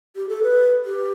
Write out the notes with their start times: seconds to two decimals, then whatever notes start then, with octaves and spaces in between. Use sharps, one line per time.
0.16 G4
0.29 A4
0.43 B4
0.85 G4